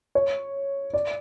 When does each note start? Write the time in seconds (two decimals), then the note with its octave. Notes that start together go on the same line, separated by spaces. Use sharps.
0.15 C#5
0.94 D5